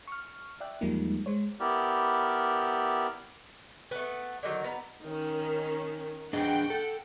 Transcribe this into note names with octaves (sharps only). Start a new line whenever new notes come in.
C#6 F6
D5 E5 G5 F#6
E2 F3 G3 G#3 A#3 D#4
G#3 C5 C#5
B3 E4 G4 A#4 D5
A3 B3
D3 D#3 F#3
B3 B4 A#5
D#3 C#4
D4 G#4 D#5 F#5 G5
A4